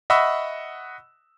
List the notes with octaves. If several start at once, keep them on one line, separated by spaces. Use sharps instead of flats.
D#5 E5 F#5 B5 C#6 E6